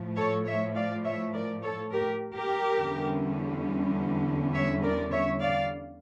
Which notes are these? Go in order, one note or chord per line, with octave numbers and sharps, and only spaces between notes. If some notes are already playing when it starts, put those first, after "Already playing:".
Already playing: A2 F3 A3
A4 C#5
C#5 E5
D5 F5
C#5 E5
A#4 D5
A4 C#5
G4 A#4
G4 A#4
E2 D3 G3 C#4
C#5 E5
A#4 D5
C#5 E5
D5 F5